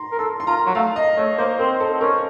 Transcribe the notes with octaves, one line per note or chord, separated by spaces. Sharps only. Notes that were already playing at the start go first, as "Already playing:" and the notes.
Already playing: A#5 C6
A#4
A4 C6
C6
F4 A#5
F#3
A3 F5
D#5
A3 C#5
A#3 C5
C4 A#4
A4
C4
C#4 A#4